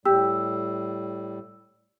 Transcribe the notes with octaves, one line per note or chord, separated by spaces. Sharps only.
A2 G3 G4 E6